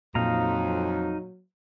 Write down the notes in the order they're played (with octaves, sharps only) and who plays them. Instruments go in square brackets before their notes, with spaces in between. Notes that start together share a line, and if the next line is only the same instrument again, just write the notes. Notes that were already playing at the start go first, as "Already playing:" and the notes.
[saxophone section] F2 [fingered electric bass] A#2 [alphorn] F#3 [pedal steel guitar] D#4 F5 A#5